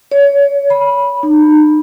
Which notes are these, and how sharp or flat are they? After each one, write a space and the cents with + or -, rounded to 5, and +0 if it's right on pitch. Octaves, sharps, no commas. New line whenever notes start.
C#5 +25
B5 -15
D#4 -40